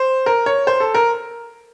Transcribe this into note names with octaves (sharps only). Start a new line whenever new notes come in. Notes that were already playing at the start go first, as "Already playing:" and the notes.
Already playing: C5
A#4
C#5
C5
A4
A#4